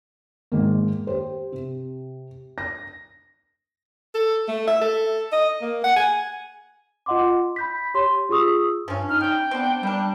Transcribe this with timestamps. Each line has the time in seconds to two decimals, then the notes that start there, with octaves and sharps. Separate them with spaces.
0.52 G#2 D#3 A#3
1.07 G4 C5
1.52 C3
2.58 A#6
4.15 A4
4.48 A3
4.67 E5
4.81 A4
5.32 D#5
5.62 A#3
5.84 F#5
5.96 G#5
7.06 F4 D#5 F#5 C6 D6
7.56 B5 G6 B6
7.94 G4 C#5 C6
8.29 F4 G#4 C#6 D#6 E6
8.88 G2 F3 C#4
9.09 D#4 F6
9.21 C#3 G3 G5
9.51 B3 C4 D4
9.83 G3 A#3 D4